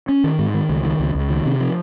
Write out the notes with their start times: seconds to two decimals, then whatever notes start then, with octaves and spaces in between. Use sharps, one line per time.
0.09 C#4
0.24 D#3
0.39 G#2
0.54 D#3
0.69 C#2
0.85 D#3
1.00 C#2
1.15 C#2
1.30 D#3
1.46 C3
1.61 F3